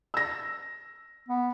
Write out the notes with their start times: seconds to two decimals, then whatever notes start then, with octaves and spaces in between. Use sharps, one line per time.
0.14 E6 A#6
1.28 B3